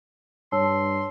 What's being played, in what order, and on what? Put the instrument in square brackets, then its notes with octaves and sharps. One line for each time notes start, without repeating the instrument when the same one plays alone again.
[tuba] G2 [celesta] C#5 A5 E6 [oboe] C6